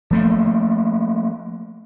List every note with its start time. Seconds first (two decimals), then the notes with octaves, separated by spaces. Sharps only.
0.11 F3 A3 A#3